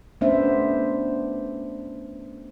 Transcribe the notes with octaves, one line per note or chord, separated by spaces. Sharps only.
A3 B3 C#4 D4 C5 E5